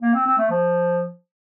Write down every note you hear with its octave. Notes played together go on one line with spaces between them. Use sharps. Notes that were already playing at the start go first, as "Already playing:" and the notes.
A#3
C4
C4
A3
F3